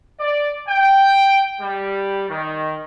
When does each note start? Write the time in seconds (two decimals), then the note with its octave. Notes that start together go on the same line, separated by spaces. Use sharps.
0.19 D5
0.68 G5
1.61 G3
2.29 D#3